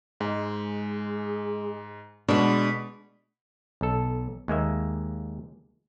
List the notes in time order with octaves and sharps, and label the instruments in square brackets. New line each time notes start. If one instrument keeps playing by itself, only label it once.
[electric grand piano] G#2 [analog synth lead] G#3
[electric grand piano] B2 [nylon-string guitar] G#3 D4 [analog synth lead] B5
[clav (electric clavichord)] B1 A4
D#2 G#3 A#3 E5